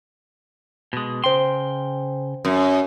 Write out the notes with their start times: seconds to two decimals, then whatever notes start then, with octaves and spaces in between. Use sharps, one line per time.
0.93 B2 G#3
1.24 C#3 C5 G5 C6
2.45 F#2